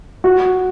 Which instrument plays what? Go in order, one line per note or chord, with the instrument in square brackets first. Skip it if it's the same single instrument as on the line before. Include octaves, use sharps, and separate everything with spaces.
[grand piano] F#4